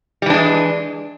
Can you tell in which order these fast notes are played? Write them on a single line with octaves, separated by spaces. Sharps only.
G3 E3 D4 G#3